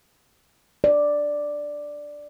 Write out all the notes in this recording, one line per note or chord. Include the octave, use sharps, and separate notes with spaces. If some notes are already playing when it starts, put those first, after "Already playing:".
D5